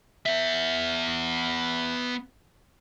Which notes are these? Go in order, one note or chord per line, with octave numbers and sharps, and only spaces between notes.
B3 E5